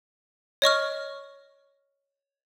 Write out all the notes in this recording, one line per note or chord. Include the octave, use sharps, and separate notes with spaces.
C#5 D#5 C#6 F6